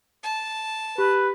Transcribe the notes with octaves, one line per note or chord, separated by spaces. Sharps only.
A5
G4 B4